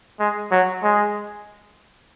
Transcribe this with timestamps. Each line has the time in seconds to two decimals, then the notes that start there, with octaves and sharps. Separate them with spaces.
0.20 G#3
0.51 F#3
0.83 G#3